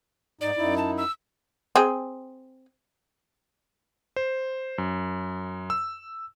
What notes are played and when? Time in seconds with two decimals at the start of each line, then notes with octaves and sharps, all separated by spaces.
0.41 G#2 D#4 D5
0.57 F#2 D#4 E4
0.77 A5
0.97 E6
1.76 C4 G#4
4.16 C5
4.78 F#2
5.70 E6